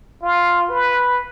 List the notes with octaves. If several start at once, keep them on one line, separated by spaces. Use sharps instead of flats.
F4
B4